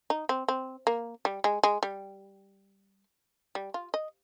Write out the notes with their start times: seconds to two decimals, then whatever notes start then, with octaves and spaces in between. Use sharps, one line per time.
0.10 D#4
0.29 C4
0.48 C4
0.87 A#3
1.25 G3
1.44 G#3
1.64 G#3
1.83 G3
3.55 G3
3.74 F4
3.94 D#5